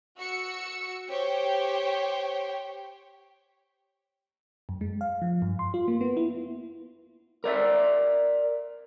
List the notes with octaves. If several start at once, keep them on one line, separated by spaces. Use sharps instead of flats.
F#4 E6 C#7
G4 C5 C#5 G5
F#2
G#3
F5
F3
G2
C6
F4
A#3
B3
E4
A#4 D5 E5